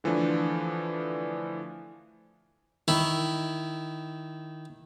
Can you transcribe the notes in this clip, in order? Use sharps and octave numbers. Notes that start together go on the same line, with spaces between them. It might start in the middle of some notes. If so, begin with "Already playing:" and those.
D3 E3 F3 A3 D4
D#3 E4